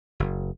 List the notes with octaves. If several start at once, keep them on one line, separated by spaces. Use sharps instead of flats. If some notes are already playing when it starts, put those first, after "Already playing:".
F#1